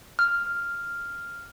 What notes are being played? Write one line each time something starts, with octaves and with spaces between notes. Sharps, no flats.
F6